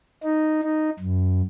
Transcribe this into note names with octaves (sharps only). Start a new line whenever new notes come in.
D#4
D#4
F#2